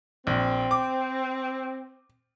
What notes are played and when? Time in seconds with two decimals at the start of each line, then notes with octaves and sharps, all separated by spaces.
0.27 A#1 C4
0.71 D6